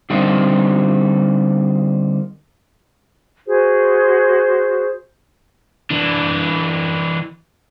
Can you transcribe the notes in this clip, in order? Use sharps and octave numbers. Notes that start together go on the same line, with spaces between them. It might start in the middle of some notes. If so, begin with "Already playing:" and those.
D3 G3 A#3 C4 D#4
F#4 G#4 C5
E3 D4